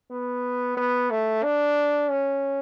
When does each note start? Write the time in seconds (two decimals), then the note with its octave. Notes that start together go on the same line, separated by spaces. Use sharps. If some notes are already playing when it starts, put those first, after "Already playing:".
0.11 B3
0.77 B3
1.10 A3
1.43 D4
2.10 C#4